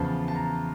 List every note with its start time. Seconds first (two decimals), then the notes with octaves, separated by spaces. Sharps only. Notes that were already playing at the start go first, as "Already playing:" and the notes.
Already playing: E2 C#3 F3 A5
0.28 A5
0.36 A#5